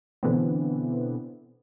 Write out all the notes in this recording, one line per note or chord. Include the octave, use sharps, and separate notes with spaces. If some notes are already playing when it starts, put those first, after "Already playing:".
B2 D3 E3 B3 C4